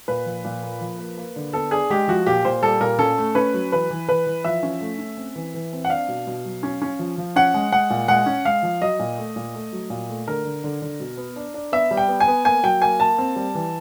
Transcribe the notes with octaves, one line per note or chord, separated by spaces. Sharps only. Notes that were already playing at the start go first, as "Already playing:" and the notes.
A#2 B4
F3
A#2
A#3
F3
A#3
A#3
D3
B3 A4
D4 G#4
G#3 G4
F3 F#4
A#2 G4
A#2 C5
G3 A4
A#2 A#4
C#4 A4
A3
C#4 B4
F#3
E3 B4
E3
E3 B4
E3
F3 E5
C#4
A3
C#4
C4
E3
E3
C4
F#5
D4 F5
B2
B2
F#3
C#4
C#4
F3
F3
C#4 F#5
G#3
G#3 F#5
A#2
G#3 F#5
C#4
G#3 F5
F3
F#3 D#5
A#2
A3
A#2
A3
F#3
A#2
A3
D3 A#4
D3
D3
D3
B2
B3
D4
D4
B3 E5
G3
G5
B3
G#5
B3
A#3 G#5
F#3 G5
A#3 G#5
A#3 A5
C4
G3
E3